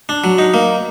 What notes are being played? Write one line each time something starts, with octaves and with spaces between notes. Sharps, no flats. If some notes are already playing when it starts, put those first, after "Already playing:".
D4
F#3
D#4
A#3